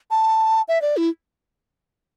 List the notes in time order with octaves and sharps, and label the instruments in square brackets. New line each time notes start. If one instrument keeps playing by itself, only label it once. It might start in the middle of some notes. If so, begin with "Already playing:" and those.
[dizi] A5
E5
D5
E4